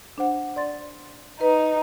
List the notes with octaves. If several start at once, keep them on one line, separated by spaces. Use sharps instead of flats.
D4 C5 F#5
D5 C6 A6
D#4 B4